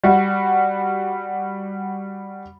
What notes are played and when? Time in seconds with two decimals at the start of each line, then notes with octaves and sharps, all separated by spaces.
0.04 G3 F#4